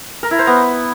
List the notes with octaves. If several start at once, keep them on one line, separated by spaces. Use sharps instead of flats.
A#4
E4
C5
B3